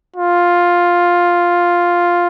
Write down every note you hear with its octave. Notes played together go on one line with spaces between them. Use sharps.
F4